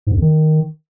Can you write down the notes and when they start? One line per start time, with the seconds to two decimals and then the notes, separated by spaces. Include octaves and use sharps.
0.07 G#2
0.12 F#2
0.17 F2
0.22 D#3